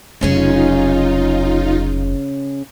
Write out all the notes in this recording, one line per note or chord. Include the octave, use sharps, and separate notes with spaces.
F1 C#3 F#3 C#4 D#4 F4 G#4